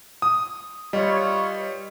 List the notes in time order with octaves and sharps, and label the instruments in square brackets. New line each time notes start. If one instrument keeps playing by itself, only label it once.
[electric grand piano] D#6
[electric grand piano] G3 [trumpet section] F4 B4 C#5 [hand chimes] D#5